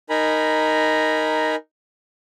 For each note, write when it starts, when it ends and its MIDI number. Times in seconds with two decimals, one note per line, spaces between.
0.10 1.56 63
0.10 1.56 70
0.10 1.56 80
0.10 1.56 82
0.10 1.56 83